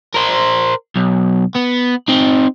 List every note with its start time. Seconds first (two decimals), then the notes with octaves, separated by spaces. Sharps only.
0.14 A#4 C5
0.96 B1
1.55 B3
2.08 C4 D#4